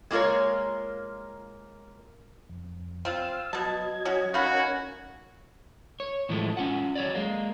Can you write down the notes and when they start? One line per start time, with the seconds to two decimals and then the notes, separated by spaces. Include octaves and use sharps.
0.11 G#3 A#3 F4 A4 A#4 C#5
2.49 F2
3.05 C4 F4 F5 E6
3.53 B2 F#3 D#5 A5 G#6
4.05 C#4 F#4
4.34 C#4 D#4 F#4 A#4 F5 G#5 B5
6.00 C#5
6.29 A2 E3 F3 G#3 A3
6.57 C#4 F4 F#5
6.95 F#3 C#5 D5
7.14 G#3 A#3